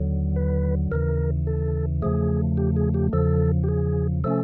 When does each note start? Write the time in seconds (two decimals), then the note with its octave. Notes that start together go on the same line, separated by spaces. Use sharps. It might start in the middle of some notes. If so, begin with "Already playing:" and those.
Already playing: D#2 D3 F#3
0.36 B4
0.92 D#2 C#3 E3 A#4
1.47 A4
2.02 E2 C#3 F3 A3 G#4
2.57 G4
2.76 G#4
2.94 G4
3.13 E2 C#3 F3 A4
3.64 G4
3.68 G#4
4.24 C3 F3 A3 C#4 A4